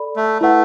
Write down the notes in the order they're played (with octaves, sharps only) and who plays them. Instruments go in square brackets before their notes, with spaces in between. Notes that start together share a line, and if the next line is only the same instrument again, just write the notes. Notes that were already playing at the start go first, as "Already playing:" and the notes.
Already playing: [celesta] A4 D5 B5
[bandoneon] A3
[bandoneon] A3 [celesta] E4 B4 F#5